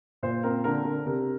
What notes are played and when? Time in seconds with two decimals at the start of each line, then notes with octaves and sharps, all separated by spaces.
0.23 A#2 C5
0.43 C4 A#4
0.64 D3 A#4
0.85 D3
1.06 C3 A#4